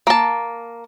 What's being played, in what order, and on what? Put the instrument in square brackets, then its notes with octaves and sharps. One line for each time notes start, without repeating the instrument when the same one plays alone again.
[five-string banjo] A#3 A5